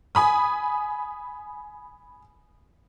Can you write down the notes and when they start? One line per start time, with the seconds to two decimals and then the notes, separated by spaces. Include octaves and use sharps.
0.15 G#5 B5 D#6